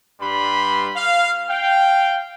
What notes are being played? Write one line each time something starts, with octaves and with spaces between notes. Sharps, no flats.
G2 G3 B4 B5 C6
F5
F5 G5